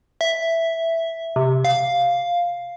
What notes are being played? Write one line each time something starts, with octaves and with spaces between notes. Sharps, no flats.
E5
C3
F5